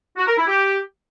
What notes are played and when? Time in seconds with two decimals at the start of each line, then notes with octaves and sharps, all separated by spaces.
0.17 F#4
0.27 A#4
0.37 E4
0.47 G4